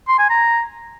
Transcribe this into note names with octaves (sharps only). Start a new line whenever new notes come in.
C6
G#5
A#5